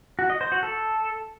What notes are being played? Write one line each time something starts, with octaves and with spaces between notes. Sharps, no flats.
F#4
D#5
C5
F#4
A4